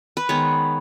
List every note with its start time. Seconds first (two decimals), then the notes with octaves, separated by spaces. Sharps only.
0.17 B4
0.29 D#3 G#3 B3 C#5